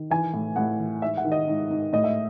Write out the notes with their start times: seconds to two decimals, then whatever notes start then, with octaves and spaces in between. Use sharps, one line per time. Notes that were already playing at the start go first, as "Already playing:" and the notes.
Already playing: D#3
0.10 E3 G#5
0.34 A2
0.56 A2 F#5
0.79 E3
1.02 G#2 E5
1.17 F#5
1.25 D#3
1.32 D#5
1.48 G#2
1.70 G#2
1.93 A2 D#5
2.04 E5